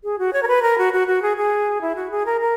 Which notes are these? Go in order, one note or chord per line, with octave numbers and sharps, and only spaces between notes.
G#4
F#4
C#5
A#4
B4
A#4
F#4
F#4
F#4
G#4
G#4
E4
F#4
G#4
A#4
A#4